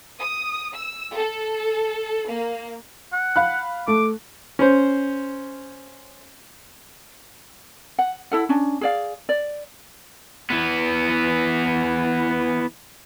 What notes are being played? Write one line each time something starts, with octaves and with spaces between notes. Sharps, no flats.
D#6
E6
A4
A#3
F#5
F5 B5 F#6
A3 D6
C#4 C5
F#5
E4 A4 F#5
C#4 D4
G#4 D5 F5
D5
E3 B3